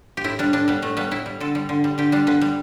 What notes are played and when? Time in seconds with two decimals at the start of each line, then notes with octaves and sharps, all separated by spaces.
0.17 G4
0.24 A2 E4
0.39 G3 D4
0.53 A2 D4
0.68 G3 B3
0.82 A2 A3
0.97 G3 B3
1.11 A2 E4
1.26 G3
1.40 D3 A4
1.55 G3
1.69 D3
1.84 G3
1.98 D3 G4
2.12 G3 D4
2.27 D3 B3
2.41 G3